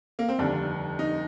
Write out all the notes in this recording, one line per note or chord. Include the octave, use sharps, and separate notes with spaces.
A#3
C4
F1 D#2 D3 G3 D4
D#4